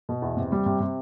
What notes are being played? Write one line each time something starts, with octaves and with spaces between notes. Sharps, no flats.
B2
E2
C3
G3
C3
C3